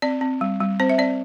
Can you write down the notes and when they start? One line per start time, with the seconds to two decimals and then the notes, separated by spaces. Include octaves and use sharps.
0.02 C4 D5
0.21 C4
0.41 G3
0.60 G3
0.80 C4 C5
0.89 E5
0.99 C4 D5